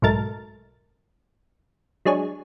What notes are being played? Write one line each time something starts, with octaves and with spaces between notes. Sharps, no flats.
B1 G#2 A3 A#4 A5 A6
F#3 G#3 D4 G#4 C#5